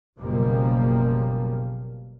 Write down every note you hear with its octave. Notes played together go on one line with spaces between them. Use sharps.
F#1 F#2 B2 F3 G3 A#3